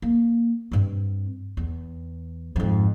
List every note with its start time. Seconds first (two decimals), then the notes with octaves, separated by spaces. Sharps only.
0.02 A#3
0.72 G2 C4
1.57 E2
2.56 F2 G#2